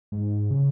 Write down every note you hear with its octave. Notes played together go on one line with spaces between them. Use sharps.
G#2
C#3